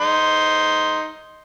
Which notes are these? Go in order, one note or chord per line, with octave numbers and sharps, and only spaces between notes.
D#4 C6